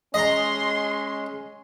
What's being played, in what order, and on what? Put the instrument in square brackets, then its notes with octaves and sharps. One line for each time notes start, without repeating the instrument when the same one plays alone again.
[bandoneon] G#3 [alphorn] C#4 [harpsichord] D#5 A#5 [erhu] C6